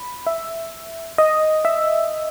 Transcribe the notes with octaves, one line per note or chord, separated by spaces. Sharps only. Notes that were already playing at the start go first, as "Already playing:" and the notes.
Already playing: B5
E5
D#5
E5